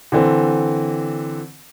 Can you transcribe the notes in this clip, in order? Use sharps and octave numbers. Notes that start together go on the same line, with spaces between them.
D3 E3 C4